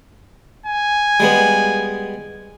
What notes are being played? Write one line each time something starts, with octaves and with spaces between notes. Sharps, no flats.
G#5
G3 G#3 B3